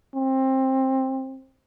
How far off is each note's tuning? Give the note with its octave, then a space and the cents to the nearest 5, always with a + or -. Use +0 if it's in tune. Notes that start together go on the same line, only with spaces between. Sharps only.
C4 +20